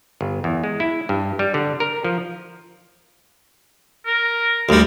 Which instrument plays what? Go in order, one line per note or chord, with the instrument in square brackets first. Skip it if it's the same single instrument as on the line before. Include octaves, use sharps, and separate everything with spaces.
[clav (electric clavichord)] G1
E2
G#3
E4
G2
G3
D3
A#4
F3
[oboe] A#4
[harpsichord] D2 G3 [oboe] A#4